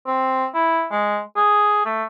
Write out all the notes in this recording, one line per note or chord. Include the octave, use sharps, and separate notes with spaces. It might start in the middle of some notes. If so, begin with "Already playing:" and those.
C4
E4
G#3
G#4
A3